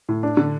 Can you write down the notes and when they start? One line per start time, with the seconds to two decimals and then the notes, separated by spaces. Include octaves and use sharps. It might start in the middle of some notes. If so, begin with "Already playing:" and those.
0.09 A2
0.23 D4
0.37 D3